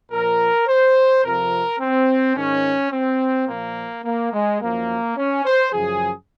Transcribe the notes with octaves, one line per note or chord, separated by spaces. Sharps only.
A#2 F3 A#4
C5
F2 C3 F3 A#4
C4
G#2 D#3 C#4
C4
A#2 F3 A#3
A#3
G#3
F#2 F3 A#3
C#4
C5
F#2 C#3 F3 G#4